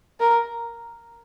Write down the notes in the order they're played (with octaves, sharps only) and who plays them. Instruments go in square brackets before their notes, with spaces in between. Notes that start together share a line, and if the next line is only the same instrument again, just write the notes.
[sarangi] A#4